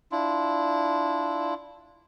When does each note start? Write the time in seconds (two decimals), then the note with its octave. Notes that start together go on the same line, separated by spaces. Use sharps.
0.12 D4 E4 F4